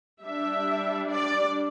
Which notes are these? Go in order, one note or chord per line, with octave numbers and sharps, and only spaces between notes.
G3 D4 E5
D5